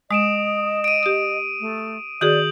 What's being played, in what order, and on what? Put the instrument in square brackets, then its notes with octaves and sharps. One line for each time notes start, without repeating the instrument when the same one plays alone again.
[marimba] G#3 [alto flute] D#5 [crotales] D#6 D7 E7
[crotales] D7 D#7
[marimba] G4 D#6
[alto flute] A3
[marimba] D#3 F#4 G#4 [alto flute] D5 [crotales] D#6 G6 F#7